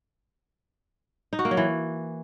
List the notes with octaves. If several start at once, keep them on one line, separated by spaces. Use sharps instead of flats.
D#4
F#4
A#3
F#3
E3